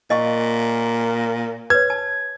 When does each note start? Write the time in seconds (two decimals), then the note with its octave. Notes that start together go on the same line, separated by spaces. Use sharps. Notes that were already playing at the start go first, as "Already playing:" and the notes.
0.10 A#2 D#5 F5 C#6
1.70 B4 C#5 G#6
1.90 A5